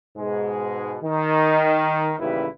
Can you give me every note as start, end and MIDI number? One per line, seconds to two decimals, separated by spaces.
0.17 0.98 44
0.17 0.98 47
0.17 0.98 56
1.02 2.14 51
2.19 2.46 33
2.19 2.46 39
2.19 2.46 49
2.19 2.46 55
2.19 2.46 64
2.19 2.46 71